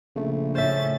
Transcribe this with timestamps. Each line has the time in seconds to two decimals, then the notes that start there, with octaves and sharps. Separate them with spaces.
0.16 A#1 C#3 A3
0.55 A2 C#4 C5 E5 A6